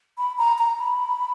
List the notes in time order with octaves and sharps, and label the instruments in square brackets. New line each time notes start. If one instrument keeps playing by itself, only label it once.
[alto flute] B5
A#5
A#5
B5